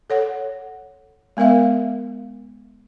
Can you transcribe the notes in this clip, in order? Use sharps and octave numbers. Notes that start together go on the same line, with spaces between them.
A4 C#5 F#5
G#3 B3 A#4 E5 F5